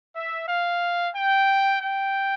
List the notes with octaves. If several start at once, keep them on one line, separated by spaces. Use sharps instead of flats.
E5
F5
G5
G5